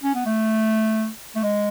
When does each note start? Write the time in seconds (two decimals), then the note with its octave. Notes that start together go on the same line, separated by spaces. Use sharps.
0.04 C#4
0.14 B3
0.26 A3
1.35 A3
1.43 G#3